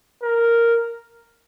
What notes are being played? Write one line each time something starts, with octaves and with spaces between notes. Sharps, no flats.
A#4